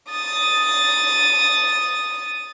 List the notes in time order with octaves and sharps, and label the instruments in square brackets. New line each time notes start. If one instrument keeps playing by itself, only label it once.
[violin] D#6 A6